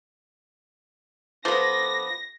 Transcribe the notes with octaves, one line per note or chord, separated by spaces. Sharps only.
F3 B3 A4 D6 A#6